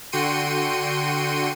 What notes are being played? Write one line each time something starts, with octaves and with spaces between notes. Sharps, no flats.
D3 F#4 G5 C6 C#7 D#7